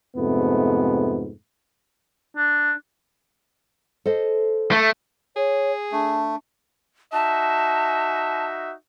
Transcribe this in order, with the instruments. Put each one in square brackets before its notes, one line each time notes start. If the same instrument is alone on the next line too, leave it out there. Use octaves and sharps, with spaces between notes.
[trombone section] F2 G#2 C3 A3 B3
[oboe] D4
[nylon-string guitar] A4 C5 D#5
[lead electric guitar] A3
[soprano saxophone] G#4 [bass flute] C#5
[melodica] A3 [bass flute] D4
[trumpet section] D#4 F#4 E5 [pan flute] A5